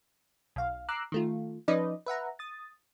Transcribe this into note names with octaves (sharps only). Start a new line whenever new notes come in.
B1 F5
A#5 D6 E6 F#6 C7
D#3 A3 F4
F3 C#4 D#4 B4 D5 D#5
B4 E5 F#5 A#5
D#6 A6